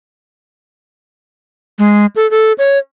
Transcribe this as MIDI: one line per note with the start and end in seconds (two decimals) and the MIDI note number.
1.79 2.06 56
2.16 2.29 69
2.31 2.52 69
2.58 2.78 73